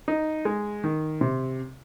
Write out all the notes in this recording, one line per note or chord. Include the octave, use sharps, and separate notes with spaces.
D#4
G#3
D#3
C3